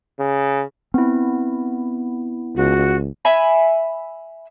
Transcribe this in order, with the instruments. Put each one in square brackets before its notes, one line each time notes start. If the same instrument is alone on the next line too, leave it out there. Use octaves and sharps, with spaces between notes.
[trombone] C#3
[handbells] B3 E4 [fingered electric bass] C4
[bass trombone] C#2 [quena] F#4
[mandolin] E5 G#5 B5